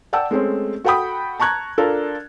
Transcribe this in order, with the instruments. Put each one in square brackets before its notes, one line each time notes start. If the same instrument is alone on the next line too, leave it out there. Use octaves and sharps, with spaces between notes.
[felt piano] D5 F#5 G5 A5 E6
G#3 A3 C4 C#4
F#4 A4 F#5 G5 B5 D#6
A5 A#5 C#6 F#6 G#6
D4 F4 A4 A#4